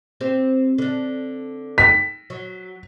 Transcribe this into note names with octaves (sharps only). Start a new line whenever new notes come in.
C4 G4 C5
D3 D4
B6
F#3